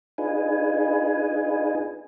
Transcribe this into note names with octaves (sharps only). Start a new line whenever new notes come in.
D4 D#4 F4 G#4 B4 G#5